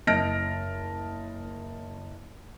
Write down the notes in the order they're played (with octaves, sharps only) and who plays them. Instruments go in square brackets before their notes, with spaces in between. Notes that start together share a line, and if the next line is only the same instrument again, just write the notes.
[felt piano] F#1 D#5 A5 F6 A#6 D7